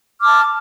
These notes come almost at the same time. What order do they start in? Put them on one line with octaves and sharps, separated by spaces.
D6 F6 A5